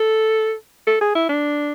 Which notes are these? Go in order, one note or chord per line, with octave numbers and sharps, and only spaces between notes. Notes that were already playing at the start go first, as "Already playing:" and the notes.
Already playing: A4
A4
G#4
E4
D4